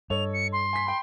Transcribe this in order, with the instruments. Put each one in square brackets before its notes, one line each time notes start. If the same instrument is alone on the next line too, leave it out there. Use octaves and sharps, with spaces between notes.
[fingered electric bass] G2 [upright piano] A4 C#5 D#5 [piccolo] F7
[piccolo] C#7
C6
[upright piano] G#5 B6
G5 B5